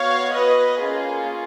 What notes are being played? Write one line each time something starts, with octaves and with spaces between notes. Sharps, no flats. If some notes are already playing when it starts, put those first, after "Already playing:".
Already playing: B3 F#4 C#5 F5
B4 D#5
A#3 C#4 F4 G#4